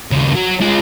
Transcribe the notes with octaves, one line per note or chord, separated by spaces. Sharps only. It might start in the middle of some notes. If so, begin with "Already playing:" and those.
D#2 C#3
F#3
G#3 F4